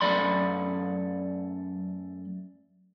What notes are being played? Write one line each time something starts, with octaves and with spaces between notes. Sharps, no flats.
F#2 A3 D5 B5 C6